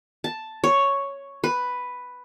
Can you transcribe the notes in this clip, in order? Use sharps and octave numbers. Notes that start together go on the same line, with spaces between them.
A5
C#5
B4